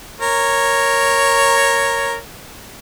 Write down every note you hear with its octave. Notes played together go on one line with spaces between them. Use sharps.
A#4 C#5